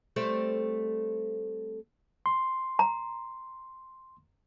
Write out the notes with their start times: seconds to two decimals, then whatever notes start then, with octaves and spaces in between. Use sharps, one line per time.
0.16 G3 A3 C4
2.26 C6
2.79 A#5